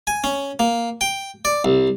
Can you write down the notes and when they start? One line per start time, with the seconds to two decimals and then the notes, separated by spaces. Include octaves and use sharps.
0.07 G#5
0.24 C#4
0.59 A#3
1.01 G5
1.45 D5
1.65 C2